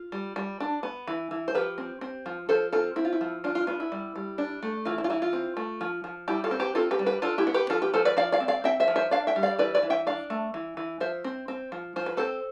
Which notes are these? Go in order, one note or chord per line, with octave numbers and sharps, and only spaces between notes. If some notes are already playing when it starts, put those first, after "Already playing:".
Already playing: F4
G3
G3
D4
B3
E3
E3
C5
F3 G4 B4
C4
C4
F3
F3 A4 C5
C4 F4 A4
C4 E4
F4
E4
F3
D4 F4
F4
B3 F4
E4
G3
G3
D4
A3
E3 F4
E4
F4
E3 E4
F4
C4
A3
F3
F3
G3 E4 G4
F4 A4
C4
G4 B4
C4 F4 A4
G4 B4
G3
G4 B4
D4 F4 A4
E4 G4
B3
G4 B4
F3 F4 A4
G4 B4
F3 A4 C5
B4 D5
F3 D5 F5
D5 F5
C4
D5 F5
C4 E5 G5
C5 E5
F3
C5 E5
D4 D5 F5
E5 G5
G3
D5 F5
E3 B4 D5
B4 D5
E3
E5 G5
D4 D5 F5
A3
E3
E3
F3 C5 E5
C4
C4
F3
F3 C5
B4
C4 A4 C5